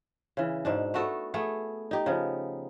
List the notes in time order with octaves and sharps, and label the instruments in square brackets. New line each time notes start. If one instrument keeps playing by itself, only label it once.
[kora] C#3 E3
G#2 B2 D4
A3 B3 F#4 A4
A3 B3 G#4 F#5
D#4 G4
C#3 F3 B3